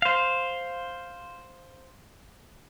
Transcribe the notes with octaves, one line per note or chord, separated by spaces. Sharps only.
C5 F5